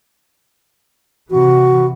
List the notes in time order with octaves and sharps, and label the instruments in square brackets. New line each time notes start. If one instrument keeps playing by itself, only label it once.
[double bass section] C3 E3 [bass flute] F#4